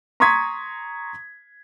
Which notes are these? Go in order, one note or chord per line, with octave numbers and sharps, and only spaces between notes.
A#5 C6 C#6 D#6 G#6 B6